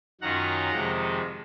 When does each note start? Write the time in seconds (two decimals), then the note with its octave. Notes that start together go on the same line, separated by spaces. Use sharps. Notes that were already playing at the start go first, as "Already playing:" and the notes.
0.21 F#2 D#3 F#3 C#4 F4 F#5 A#5
0.72 F2 C3 D#3 G#3